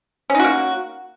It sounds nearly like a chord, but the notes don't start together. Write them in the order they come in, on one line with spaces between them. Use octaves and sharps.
C#4 D#4 F#4 A#3